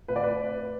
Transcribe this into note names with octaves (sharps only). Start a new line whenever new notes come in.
A2 B4
D5
B4